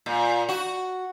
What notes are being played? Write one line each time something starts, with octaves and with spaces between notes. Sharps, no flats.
A#2
F#4